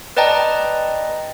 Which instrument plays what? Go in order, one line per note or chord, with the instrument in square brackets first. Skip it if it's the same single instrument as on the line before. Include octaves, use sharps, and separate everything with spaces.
[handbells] B4 D5 D#5 G5 A5 A#5